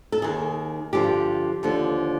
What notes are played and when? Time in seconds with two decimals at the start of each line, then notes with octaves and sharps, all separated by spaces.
0.12 A4
0.22 D#2 D#3 G#4
0.93 G2 D3 F3 G4
1.63 D#2 D3 F3